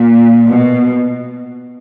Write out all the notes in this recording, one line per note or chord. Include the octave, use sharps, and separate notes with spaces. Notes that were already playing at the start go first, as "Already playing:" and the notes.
Already playing: A#2
B2